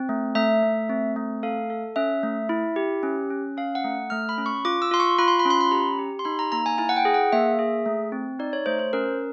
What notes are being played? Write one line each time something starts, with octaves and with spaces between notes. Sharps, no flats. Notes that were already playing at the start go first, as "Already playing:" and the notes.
Already playing: C4
A3
A3 E5
A3
C4
A3
A4 F5
A4
C#4 E5
A3
E4
G4
C#4
C#4
C#4 F5
F#5
A3
A3 F6
B5
C#4
C#6
F4 D6
E6
F4 C6
C#6
F4 B5
C6
B5
C#4
C6
B5
G4 A#5
G4
C6
D#4 B5
A#5
A#3 A#5
G#5
E4 G#5
F#5
G5
G#4
F#5
A#3 E5
G#4
A3
C4
D#4 D5
C#5
A3 C5
C5
C#4 A#4